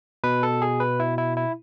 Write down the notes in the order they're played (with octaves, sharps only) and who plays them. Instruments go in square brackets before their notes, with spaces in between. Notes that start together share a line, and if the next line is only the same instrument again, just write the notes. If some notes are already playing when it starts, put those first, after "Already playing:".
[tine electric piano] B2 B4
A4
G#4
B4
E4
E4
E4